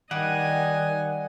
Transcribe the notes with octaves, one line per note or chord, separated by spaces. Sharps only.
D#3 G3 D#5 F#5 G#5